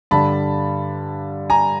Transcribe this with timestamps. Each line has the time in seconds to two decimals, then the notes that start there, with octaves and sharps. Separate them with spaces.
0.11 G2 D3 G3 A5 B5
1.50 G#5 A#5